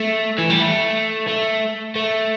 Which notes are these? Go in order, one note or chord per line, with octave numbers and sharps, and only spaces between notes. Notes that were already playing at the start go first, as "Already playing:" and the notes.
Already playing: A3
E3
G3
A3
A3
A3